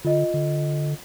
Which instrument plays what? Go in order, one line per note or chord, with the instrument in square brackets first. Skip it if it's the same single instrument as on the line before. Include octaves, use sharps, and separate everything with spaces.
[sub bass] D3 [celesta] F4 D#5
[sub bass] D3